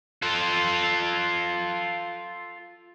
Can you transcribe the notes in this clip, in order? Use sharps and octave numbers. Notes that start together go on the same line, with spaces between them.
F4 A4